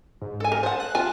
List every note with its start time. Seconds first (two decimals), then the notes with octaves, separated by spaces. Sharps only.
0.22 G#2
0.40 A4 G#5
0.52 A#4
0.63 C5 F#5 A5
0.80 F#6
0.95 F4 G#5 A5